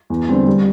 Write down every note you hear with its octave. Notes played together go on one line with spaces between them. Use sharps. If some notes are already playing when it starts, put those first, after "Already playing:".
E2
D3 G3 C4
G3